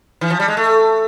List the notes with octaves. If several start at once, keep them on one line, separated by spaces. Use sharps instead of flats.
E3
F3
G3
G#3
A3